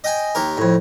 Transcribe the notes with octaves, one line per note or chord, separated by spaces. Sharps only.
D#5 G5 G#5
D#2 G4 A#4
F2 A2